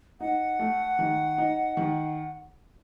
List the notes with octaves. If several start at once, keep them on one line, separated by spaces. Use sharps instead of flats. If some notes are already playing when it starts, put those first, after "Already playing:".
D#4 F#5
A3
D#3
D#4
D#3